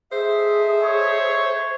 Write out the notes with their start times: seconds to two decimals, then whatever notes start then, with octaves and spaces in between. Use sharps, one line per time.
0.12 G#4 A4 C5 D#5 E5
0.83 C#5